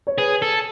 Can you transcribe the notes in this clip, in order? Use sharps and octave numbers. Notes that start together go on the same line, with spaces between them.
C#5
G#4 B4
A4